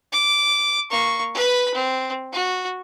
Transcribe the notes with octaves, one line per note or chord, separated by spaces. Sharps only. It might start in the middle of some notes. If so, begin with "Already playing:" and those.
D6
A#3 C#6
B4 B5
C4
F#4